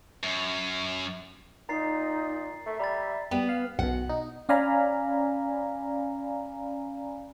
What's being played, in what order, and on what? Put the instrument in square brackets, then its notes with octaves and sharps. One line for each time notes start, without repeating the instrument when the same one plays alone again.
[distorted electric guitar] F#2
[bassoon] A#2 [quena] D#4 [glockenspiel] A#5 A6 C7
[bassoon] A3 [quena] E5
[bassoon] G3 [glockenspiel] A#5 B5 A6
[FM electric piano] G3 [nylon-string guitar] B3
[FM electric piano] F5
[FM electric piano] B1 B2 [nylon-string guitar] F#5
[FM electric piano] D#4
C#4 D5 F5 G#5 A#5 B5